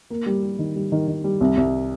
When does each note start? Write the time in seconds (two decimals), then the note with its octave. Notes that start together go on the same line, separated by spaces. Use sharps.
0.10 A#3
0.26 G3
0.43 G3
0.59 D#3
0.75 G3
0.92 D#3
1.08 D#3
1.24 G3
1.41 C2
1.57 C2